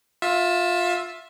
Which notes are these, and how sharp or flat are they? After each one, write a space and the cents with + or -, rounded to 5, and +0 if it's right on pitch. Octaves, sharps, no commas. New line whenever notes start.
F4 +20 E5 +0